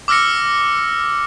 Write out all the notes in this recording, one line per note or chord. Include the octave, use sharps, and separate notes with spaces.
D6 E6 F6 A#6 C#7